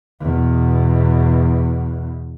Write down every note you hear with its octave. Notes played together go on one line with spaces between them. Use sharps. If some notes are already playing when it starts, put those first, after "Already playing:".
E2 B2